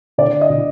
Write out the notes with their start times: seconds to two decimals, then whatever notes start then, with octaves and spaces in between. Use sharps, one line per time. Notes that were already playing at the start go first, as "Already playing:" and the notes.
0.18 D3 D5
0.41 D#5
0.50 D3